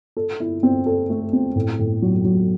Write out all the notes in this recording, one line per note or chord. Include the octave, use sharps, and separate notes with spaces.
A4
E4
C4
A4
A3
C4
A2
A2
F#3
F#3